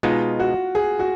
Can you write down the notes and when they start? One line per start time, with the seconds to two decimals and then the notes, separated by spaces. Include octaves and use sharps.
0.03 B2 G#3 B3 D#4 F4
0.40 F#4
0.75 G#4
0.99 F#4